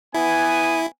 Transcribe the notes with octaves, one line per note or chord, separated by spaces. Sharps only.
B3 E4 G#5